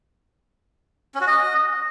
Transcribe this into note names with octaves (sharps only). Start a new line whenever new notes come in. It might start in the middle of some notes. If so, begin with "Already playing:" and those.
C#4
F#4
D#5